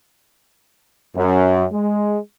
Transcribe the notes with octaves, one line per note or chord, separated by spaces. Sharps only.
F#2
G#3